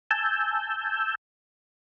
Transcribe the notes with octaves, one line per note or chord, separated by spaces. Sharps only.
G#5 A5 E6 G6